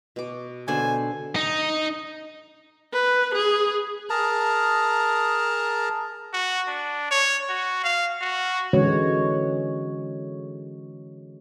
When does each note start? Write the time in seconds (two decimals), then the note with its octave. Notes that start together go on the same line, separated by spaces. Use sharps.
0.16 B2 D6
0.68 B2 D3 D4 A4 C5 D5 G#5
1.36 D#4
2.93 B4
3.34 G#4
4.10 G#4 A#4 A5 A#5
6.33 F#4
6.68 D4
7.11 C#5
7.49 F#4
7.84 F5
8.21 F#4
8.73 D3 E3 G#3 C#4 F#4 C#5